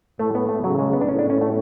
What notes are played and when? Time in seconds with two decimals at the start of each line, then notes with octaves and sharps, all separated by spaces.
0.19 A2 A3
0.35 B3
0.49 A3
0.64 C#3 F#3
0.79 G#3
0.93 B3
1.01 D4
1.09 A2 C#4
1.19 D4
1.30 C#4
1.41 A3